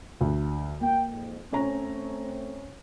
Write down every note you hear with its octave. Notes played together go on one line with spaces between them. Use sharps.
D2
A#3 G5
F2 G#2
A3 C4 C#4 C#5 A#5